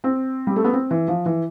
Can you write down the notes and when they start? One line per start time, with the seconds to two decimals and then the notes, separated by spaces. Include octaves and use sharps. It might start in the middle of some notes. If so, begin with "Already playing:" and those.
0.04 C4
0.47 G3
0.56 A3
0.64 B3
0.73 C4
0.91 E3
1.08 F3
1.26 E3